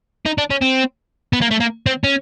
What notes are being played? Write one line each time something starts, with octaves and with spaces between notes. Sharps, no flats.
D#4
D4
C#4
C4
B3
A#3
A3
A#3
C4
C#4